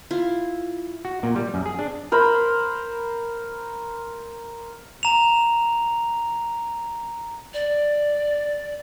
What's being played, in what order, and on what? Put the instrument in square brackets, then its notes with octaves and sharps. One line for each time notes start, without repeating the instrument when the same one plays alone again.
[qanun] E4 F4
[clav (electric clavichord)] F#4
A#2
G3
F#2
G#4
D4
[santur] A#4 C5 B5
[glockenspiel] A#5 F7
[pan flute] D5